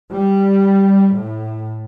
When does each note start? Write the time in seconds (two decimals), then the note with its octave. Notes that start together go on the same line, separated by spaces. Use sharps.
0.11 G3
1.16 A2